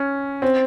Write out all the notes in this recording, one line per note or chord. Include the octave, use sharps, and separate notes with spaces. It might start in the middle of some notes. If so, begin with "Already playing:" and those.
Already playing: C#4
C4